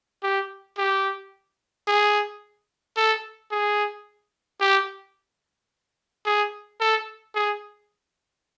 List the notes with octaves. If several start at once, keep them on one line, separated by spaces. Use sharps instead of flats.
G4
G4
G#4
A4
G#4
G4
G#4
A4
G#4